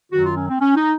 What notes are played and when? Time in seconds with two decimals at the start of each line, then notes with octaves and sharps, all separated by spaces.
0.12 F#2 D#3 F#3 F#4
0.24 F4
0.36 C#4
0.48 C4
0.60 C#4
0.76 D#4